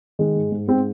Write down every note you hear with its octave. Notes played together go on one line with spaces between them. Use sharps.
D#3 G#3
G#2
G#2
G#2 C4